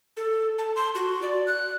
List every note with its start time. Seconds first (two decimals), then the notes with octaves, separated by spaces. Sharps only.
0.17 A4
0.58 A5
0.76 C6
0.95 F#4
1.22 D5
1.47 F#6